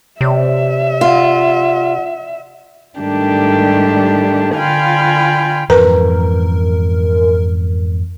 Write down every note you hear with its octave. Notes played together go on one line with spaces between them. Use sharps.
C3 C#5 D5 E5
F4 D5 F#5
G#2 D#3 G3 A3 D4 G4
D3 F4 F5 G5 G#5 B5
F2 G#2 E3 A#4 B4